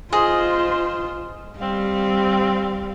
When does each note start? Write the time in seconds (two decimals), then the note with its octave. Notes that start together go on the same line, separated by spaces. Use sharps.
0.13 F4 G#4 C5 D#5
1.59 G3 C4 F5